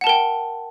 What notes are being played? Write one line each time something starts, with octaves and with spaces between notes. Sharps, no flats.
A#4 F#5 G5 A5